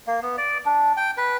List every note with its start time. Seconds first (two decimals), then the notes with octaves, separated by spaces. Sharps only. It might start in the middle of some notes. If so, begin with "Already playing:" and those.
0.07 A#3
0.22 B3
0.38 D5
0.66 D4
0.97 G5
1.17 B4